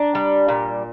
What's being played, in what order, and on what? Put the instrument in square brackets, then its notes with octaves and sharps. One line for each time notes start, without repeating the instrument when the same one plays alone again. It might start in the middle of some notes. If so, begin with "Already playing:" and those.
Already playing: [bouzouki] D4 [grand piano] A#5
[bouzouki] G3
A#2